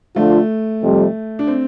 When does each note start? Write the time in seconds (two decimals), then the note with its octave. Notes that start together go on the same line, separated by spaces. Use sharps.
0.16 D3 F3 A3 D4 F4
0.82 F2 C3 G3
1.39 D4
1.47 C4